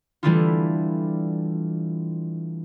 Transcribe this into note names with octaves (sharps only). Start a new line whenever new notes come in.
E3 G3 A3 D4 E4 F4